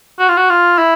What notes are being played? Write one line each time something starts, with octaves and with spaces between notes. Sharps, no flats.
F#4
F4
F#4
F4
E4